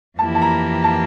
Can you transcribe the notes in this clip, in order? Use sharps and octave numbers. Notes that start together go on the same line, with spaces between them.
F2 E3 A#3 E4 G4 A5
A5
A#5
A5